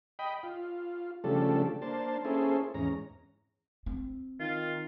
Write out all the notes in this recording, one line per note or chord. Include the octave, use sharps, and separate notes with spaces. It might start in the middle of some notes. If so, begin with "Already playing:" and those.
D#5 G5 B5
F4
C#3 F3 G3 A3 D4 A4
A#3 D4 C5 A5
A#3 C#4 E4 G#4 A4 C5
E2 G#2 C#4 A#5
C4
D#3 F4